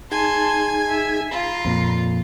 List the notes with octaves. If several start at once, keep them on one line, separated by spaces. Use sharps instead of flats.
D#4 G#4 G#5 A5 C6 G#6
E5
F4 A#5 B5 C7
F2 A#2